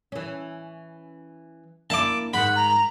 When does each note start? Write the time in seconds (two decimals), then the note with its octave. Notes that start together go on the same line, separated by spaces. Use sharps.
0.12 E3 C#4
1.90 A#3 D4 E4 A5 D6
2.34 G#2 D#3 F#5 B5
2.56 A#5